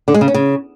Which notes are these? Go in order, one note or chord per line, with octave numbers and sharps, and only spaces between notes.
D3
G#3
C#3
C#4
C#3